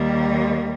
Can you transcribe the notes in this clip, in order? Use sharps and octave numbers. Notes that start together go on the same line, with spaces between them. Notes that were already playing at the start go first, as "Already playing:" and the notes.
Already playing: D#2 D#3 G3 A#3